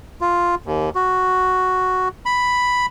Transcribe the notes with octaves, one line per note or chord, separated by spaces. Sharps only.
F4
D#2
F#4
B5